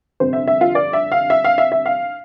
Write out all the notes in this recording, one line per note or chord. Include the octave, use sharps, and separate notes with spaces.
G1 F2 C3 C5
E5
E5
F4
D5
E5
F5
E5
F5
E5
E5
F5